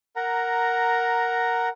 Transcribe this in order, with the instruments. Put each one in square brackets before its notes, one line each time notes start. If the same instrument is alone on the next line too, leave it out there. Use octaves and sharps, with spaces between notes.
[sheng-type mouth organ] A#4 F#5 A#5